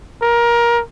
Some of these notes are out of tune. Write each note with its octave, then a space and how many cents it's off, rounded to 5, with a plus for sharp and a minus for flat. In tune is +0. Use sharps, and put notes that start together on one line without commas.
A#4 +20